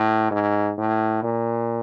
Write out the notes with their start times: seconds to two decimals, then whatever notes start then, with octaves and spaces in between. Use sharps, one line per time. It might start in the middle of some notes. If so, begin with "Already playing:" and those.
Already playing: A2
0.31 G#2
0.78 A2
1.23 A#2